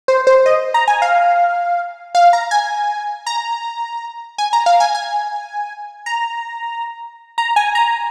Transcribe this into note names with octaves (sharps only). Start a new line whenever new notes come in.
C5
C5
D#5
A#5
G#5
F5
F5
A#5
G#5
A#5
G#5
A#5
F5
G#5
G#5
A#5
A#5
G#5
A#5